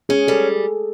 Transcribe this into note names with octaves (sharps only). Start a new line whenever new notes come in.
C#4 G#4
G3 A4